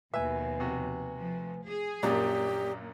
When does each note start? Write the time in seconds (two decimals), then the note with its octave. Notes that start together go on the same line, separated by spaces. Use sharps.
0.14 D#2 B2 F3 B4 E5 G#5
0.60 C3 F#4
1.19 F3 A3
1.67 G#4
2.03 A#1 F#2 A#2 A#3 G4 D5 D#6